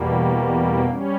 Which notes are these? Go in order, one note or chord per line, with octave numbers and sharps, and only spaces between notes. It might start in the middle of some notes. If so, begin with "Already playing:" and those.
Already playing: E2 B2 G3 A#3
G3 C#4